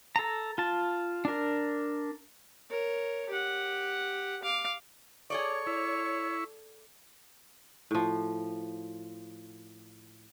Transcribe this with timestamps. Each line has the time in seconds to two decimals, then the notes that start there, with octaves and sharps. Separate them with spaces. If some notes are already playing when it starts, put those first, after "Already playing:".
0.16 A4 A#5
0.58 F4 A5
1.25 D4 A#4
2.70 A#4 C#5
3.29 G4 F#5
4.43 F5 D6
5.30 G#4 A4 C#5 D5 C#6
5.67 E4
7.91 A2 F3